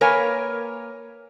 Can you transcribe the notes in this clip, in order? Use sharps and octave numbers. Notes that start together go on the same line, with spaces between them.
A#3 A#4 B4 C#5 G#5